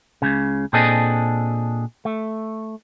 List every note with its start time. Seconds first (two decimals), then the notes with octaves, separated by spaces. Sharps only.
0.22 C#2 C#3
0.73 A#2 C4 D4 G#4 A4 D#5
2.05 A3